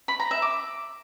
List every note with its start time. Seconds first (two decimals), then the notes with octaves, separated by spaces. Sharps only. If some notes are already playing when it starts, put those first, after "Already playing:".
0.08 B5
0.20 A#5
0.31 E5
0.42 D6